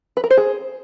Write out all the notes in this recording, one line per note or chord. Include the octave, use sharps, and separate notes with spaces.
B4
A#4
C5
G#4